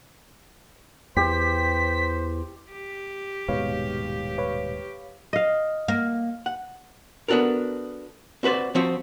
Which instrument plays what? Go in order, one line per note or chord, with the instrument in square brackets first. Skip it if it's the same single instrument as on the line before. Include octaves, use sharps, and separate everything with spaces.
[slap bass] E2 [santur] G4 [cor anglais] C5 [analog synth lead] B6
[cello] G4
[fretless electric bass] D#1 G#2 B2 [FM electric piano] B4 C#5 F5
[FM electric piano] B4 C#5 F5
[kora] D#5 F5
[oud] A#3
[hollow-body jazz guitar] F#5
B3 D4 F#4 A4 A#4
C4 F#4 B4 C5 D5
F3 C4 F#4